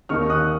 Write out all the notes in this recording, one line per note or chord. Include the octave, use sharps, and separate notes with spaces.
D#2 D#3 A#3 D#4 C#6 F6
D#6 F#6